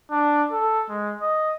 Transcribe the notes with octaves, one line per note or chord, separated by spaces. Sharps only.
D4
A4
G#3
D#5